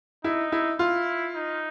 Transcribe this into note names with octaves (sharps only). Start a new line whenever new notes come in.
D#4 E4
E4
E4 F4
D#4